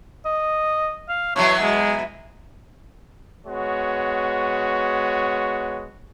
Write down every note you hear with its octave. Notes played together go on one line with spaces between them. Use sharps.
D#5
F5
B2 E3 F#3 C#5
G#3
G#3 B3 F#4 C#5